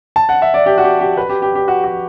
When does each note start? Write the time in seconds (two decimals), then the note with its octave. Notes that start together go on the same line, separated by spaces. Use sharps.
0.16 A5
0.29 F#5
0.42 E5
0.54 D5
0.66 G4
0.78 F#4
0.84 G4
1.01 G4
1.17 B4
1.29 G4
1.42 G4
1.55 G4
1.68 F#4
1.84 F#4